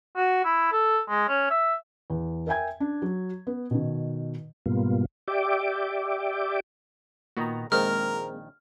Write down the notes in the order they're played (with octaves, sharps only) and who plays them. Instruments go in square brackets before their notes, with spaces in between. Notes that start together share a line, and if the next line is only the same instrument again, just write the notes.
[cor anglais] F#4
E4
A4
G#3
C#4
E5
[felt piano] E2
A#4 E5 G5 G#5 G#6
D4
F#3
B3
B2 D#3
[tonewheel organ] G#2 B2 G3 A#3 B3 F4
G4 D5 E5 G5 D6
[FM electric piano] A#2 A#5 [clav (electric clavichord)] D#3 B3 F#4
[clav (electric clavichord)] A#1 D#3 [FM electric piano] G#3 A#3 C4 [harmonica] A#4 [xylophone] F6